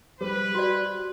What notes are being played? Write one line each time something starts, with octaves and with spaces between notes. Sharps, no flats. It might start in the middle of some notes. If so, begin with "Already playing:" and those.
G3 B4 C5
F#4 D5